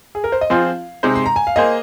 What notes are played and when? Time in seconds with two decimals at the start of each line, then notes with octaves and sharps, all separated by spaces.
0.15 G#4
0.24 A#4
0.32 C5
0.41 D#5
0.50 F3 C4 F4 G#4 C5 F5
1.03 C3 G#3 D#4 C5
1.16 C6
1.26 A#5
1.36 G#5
1.47 F5
1.56 A#3 G#4 C5 D#5